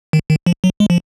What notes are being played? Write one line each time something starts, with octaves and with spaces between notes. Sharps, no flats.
D#3
D#3
F3
F#3
G#3
F3